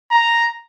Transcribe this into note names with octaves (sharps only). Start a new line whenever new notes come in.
A#5